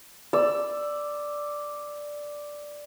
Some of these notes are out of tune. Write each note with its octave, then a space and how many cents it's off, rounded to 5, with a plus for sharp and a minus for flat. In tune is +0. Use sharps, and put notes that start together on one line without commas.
D5 +0 E6 +10